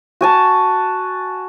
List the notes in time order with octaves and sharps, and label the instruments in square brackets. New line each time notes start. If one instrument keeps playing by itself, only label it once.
[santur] F#4 G#5 A5